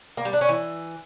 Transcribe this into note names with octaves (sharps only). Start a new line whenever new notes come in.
A#3
G3
D4
C#4
E3